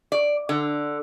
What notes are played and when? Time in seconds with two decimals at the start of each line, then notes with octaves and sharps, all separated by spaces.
0.12 D5
0.49 D3